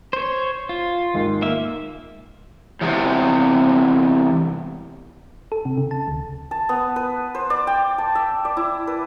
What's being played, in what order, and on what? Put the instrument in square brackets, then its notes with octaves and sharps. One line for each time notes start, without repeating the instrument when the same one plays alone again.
[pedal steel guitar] C5 C#5
F4
[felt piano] D#2 G#2
[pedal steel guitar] A#3 E5
[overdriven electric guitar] E2 C3
[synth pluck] A4
C3
C#3
A5
D2
[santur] A5
B3
B4
C5
D5
G5
A5
E5
D5
E4
B4